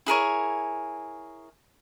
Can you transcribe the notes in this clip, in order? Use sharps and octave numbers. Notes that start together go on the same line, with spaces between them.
E4 G#4 A#4 C#5